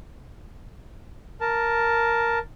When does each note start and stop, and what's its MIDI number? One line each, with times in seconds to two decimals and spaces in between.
1.41 2.39 70
1.41 2.39 81